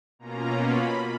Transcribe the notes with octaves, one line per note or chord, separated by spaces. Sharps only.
B2 A#3 C#4 F4 A#5
B5